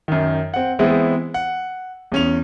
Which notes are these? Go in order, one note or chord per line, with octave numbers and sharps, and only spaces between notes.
F#2 D#3
C4 F#5
E3 G#3 B3 C4 E4
F#5
E2 C#4 F7